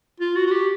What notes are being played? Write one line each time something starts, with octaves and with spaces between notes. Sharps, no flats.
F4
F#4
F#4
G4